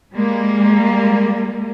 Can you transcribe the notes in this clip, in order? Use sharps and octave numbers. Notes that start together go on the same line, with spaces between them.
G3 G#3 A#3